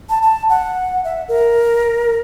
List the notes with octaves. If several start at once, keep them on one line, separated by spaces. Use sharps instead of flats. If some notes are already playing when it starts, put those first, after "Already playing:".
A5
A5
F#5
E5
A#4